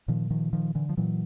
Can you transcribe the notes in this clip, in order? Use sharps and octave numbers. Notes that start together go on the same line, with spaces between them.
A#2 D#3 F3
D#3 F3
D#3 F3
D3 E3
F3
A#2 E3 F#3